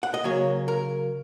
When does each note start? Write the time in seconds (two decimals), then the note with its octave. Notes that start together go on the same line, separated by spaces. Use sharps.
0.03 F#5
0.14 D#5
0.24 C#3 F#3 A#3 C#5
0.68 A#4